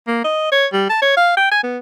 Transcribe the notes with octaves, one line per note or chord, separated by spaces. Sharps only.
A#3
D#5
C#5
G3
A5
C#5
F5
G5
G#5
B3